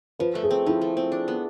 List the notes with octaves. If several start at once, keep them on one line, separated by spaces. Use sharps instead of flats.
F3 B4
A3
G#4
C4
F3 E4
A3
C4
D4
B3